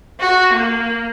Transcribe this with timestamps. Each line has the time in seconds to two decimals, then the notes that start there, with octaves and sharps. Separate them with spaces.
0.19 F#4
0.52 A#3